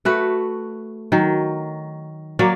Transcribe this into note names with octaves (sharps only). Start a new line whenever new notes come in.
A3 F#4 B4
D#3 F#3
F#3 A#3 C#5 D5